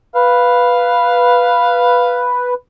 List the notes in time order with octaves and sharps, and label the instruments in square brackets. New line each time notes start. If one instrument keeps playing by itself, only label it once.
[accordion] B4 [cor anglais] F5